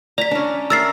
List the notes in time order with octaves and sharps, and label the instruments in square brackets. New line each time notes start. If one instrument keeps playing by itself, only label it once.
[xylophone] D5 B6 [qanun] A#5
[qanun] C#4 D4
[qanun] A#4 E5 [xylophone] E6 A6 C7